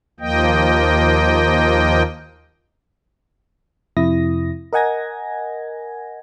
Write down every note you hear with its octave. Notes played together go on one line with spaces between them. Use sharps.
D#2 F3 A#3 D#5 G5
F2 C3 E4 D#6 A#6
A#4 D#5 F#5 G#5 G#6 A#6